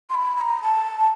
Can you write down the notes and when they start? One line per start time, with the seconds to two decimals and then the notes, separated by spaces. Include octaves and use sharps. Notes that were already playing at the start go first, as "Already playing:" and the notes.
0.10 C6
0.14 B5
0.36 B5
0.41 A#5
0.63 A5